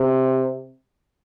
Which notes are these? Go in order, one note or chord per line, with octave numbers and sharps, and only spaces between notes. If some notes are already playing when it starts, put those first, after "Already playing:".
Already playing: C3